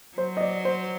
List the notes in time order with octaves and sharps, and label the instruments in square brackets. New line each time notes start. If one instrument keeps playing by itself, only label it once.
[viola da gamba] F#3 [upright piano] C5
[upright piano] D#5
D5
C5